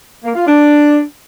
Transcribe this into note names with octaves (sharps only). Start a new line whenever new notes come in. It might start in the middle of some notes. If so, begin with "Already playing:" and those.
A#3
F4
D4